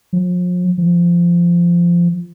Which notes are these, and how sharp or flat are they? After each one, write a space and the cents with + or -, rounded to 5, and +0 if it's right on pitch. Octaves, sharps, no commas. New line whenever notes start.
F3 +40
F3 -15